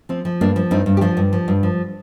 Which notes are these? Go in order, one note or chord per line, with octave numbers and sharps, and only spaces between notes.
F3 C4
F3
G2 A#3 D4
F3
G2 C4 D#4
G2
G4
F3 D4 F4
G2
F3
G2
F3